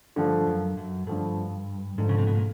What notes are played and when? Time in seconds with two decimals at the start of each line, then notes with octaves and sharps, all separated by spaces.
0.16 G2 D3 F3 A3
0.47 F#2
0.77 F#2
1.07 G2 D3 F3 A3
1.98 G#2 D3 F3 A3
2.09 C#3
2.18 C3
2.27 B2
2.35 A#2